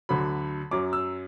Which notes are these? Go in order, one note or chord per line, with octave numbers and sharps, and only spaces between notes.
D2 D3 F#3 B5
F#2 F#3 D6
E6